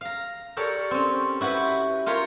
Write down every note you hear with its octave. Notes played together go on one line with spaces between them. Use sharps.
F5 A#5
G4 A4 A#4 C#5 D5
C4 C#4
E4 F#4 G4 B4
F4 G4 A#4 C#5